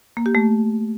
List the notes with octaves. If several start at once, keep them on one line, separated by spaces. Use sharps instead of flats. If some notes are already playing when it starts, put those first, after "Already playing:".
A#3
G4
A3